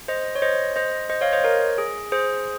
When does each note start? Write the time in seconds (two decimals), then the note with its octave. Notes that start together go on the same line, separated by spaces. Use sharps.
0.08 C5 D#5
0.35 C#5
0.42 C5 D#5
0.76 C5 D#5
1.10 C5 D#5
1.21 C#5 F5
1.33 C5 D#5
1.44 A#4 C#5
1.78 G#4
2.12 G#4 C5